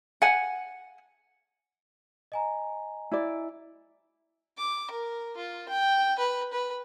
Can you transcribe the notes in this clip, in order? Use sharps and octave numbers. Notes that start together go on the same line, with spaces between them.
F#5 G#5
D#5 G#5 A#5
E4 D5
D6
A#4
F4
G5
B4
B4